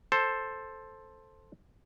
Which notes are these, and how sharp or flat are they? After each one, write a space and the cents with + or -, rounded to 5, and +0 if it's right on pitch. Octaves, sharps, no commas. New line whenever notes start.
A4 +0 C5 +10